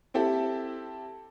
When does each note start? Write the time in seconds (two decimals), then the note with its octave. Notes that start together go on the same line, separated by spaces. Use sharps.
0.14 C4 E4 G4 A4